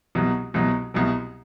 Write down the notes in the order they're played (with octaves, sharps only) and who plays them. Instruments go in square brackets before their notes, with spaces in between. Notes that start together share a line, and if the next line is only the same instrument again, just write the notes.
[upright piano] C2 B2 F#3
C2 B2 F#3
C2 B2 F#3